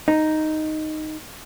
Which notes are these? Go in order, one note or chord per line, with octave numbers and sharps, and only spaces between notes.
D#4